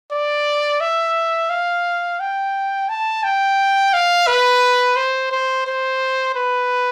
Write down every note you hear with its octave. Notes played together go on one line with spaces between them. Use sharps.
D5
E5
F5
G5
A5
G5
F5
B4
C5
C5
C5
B4